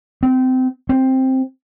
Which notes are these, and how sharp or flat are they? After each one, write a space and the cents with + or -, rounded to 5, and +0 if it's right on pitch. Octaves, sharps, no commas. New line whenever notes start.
C4 -25
C4 +5